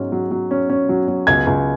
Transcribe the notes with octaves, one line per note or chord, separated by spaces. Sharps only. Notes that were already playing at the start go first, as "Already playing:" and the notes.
Already playing: G#2 F#3 C#4
F#3
F#3
C#4
C#4
F#3
F#3
C#2 G#6
C#2